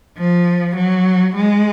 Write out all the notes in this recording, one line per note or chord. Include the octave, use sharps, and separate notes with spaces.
F3
F#3
G#3